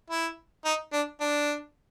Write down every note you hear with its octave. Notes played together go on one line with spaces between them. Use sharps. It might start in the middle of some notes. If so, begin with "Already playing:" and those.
E4
D#4
D4
D4